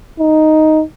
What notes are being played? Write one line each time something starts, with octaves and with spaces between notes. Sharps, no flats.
D#4